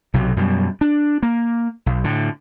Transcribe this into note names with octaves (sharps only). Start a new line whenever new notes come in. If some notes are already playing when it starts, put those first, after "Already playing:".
B1 C3 F#3
F#2 B2 G3
D4
A#3
B1
A2 D3